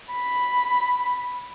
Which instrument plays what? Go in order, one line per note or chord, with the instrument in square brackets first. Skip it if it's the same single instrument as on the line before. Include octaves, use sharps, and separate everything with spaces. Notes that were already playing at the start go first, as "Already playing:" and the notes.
[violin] B5